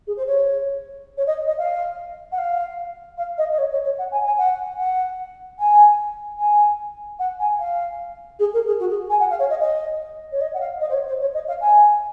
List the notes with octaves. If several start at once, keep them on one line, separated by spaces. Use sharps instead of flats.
G#4
C5
C#5
C#5
D#5
D#5
F5
F#5
F5
F5
D#5
D#5
C#5
C#5
C#5
F#5
G#5
G#5
F#5
F#5
G#5
G#5
F#5
G#5
F5
G#4
A#4
G#4
F#4
G#4
G#5
F#5
F5
C#5
D#5
D#5
C#5
D#5
F#5
F5
D#5
C5
C#5
C5
C#5
D#5
F5
G#5